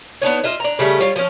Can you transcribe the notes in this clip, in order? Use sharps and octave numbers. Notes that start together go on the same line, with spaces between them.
B3 D4 D#4 C#5
F4 D#5 E5
D4 A#5
C#3 G3 A3
G3 F4 C#5
F3 C#4